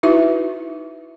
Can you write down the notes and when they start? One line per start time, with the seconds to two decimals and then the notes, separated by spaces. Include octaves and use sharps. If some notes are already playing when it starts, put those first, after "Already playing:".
0.03 D#4 E4 F#4 B4 E5